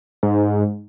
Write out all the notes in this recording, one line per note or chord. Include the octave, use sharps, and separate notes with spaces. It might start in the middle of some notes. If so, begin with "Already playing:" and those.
G#2